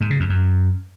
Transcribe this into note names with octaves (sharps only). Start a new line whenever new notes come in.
G#2
C#3
F2
F#2